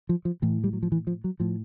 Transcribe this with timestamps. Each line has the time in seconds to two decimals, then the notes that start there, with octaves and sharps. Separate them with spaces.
0.09 F3
0.25 F3
0.42 A2 E3
0.64 G3
0.73 F#3
0.83 F3
0.92 E3
1.07 F3
1.24 F#3
1.40 A2 F3